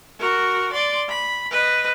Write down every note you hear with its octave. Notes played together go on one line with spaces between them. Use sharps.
F#4 A#4
D5 C6
B5
B4 D#5